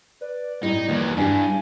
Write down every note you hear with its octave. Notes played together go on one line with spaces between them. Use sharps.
B4 D5
A2 G3 C4 D#4 E4
D#2 E3 F3 B3
G2 D4 G4 G#5